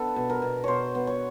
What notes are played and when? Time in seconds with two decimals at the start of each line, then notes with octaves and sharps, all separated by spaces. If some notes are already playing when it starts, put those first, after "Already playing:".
Already playing: B3 D4 A4
0.16 B2
0.30 A#4
0.42 B2
0.64 B2 C5 C#5
0.95 B3
1.07 C#5